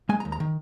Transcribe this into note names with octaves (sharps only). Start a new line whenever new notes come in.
G#3 G#5
A#5
D#2
A#5
D#3